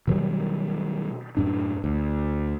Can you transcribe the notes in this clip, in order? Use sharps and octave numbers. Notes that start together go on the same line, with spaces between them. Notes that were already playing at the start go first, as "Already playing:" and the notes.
B2 D#3 F#3 G3
F#2 A2 D4
D2